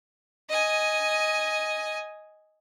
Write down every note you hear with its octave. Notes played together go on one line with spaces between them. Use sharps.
D#5 G#5